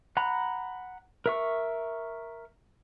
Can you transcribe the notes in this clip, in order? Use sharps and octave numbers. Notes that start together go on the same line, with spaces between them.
F#5 A#5 B5
A#4 E5 C#6